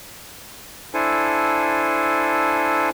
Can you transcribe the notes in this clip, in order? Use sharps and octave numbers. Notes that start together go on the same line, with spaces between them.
D4 E4 A4 C5 G#5